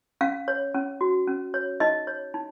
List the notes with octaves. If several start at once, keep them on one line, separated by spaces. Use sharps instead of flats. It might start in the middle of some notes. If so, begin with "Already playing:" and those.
C#4 F5
C#5
C#4
F#4
C#4
C#5
D#4 D#5
C#5
D#4